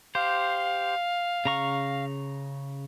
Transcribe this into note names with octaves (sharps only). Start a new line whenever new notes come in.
G4 C5 F5
C#3 A#5 C#6